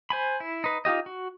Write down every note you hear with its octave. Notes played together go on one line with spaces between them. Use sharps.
C5 G#5 B5
E4
D#4 B4
D#4 F4 G4 D#5
F#4